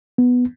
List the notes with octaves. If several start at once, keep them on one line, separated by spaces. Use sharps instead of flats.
B3